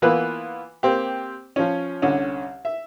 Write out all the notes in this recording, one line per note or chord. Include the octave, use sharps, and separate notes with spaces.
E3 A#3 B3 F4 B4
A#3 C4 G4
F3 C#4
C2 D3 C#4
E5